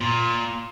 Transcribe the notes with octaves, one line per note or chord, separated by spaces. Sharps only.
A#2